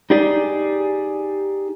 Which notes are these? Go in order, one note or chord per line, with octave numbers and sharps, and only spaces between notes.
D#4 G4 G#4 D5